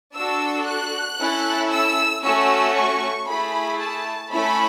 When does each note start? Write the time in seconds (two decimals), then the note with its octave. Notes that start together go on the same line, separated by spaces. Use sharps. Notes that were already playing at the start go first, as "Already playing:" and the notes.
0.15 D4 F#4 A4 E6
0.66 F#6
1.19 C#4 E4 A4
1.71 E6
2.23 A3 C#4 F#4 E6
2.75 C#6
3.27 A3 E4 G#4 B5
3.79 A5
4.31 A3 C#4 E4 B5